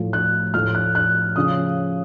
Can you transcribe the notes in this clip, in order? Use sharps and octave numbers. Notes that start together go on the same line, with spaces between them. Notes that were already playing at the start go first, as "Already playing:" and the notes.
Already playing: A2 F3 A3
F#6
A2 F3 A3 F6
F#6
F#6
C#3 F3 D#6